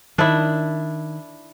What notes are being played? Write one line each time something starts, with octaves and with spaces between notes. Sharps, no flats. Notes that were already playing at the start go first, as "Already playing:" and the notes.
D#3 D4 E4